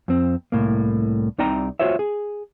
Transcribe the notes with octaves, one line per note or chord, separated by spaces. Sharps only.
F2 C4
C2 A2 A#3
C2 C3 D#4 D5 G5 A#5
F4 F#4 C5 C#5 E5
G#4